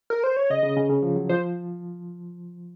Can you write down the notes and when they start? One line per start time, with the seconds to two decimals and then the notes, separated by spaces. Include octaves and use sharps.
0.10 A#4
0.24 C5
0.37 C#5
0.50 C#3 D#5
0.63 C#3
0.77 C#3
0.90 C#3
1.03 F3
1.16 F#3
1.29 F3 C5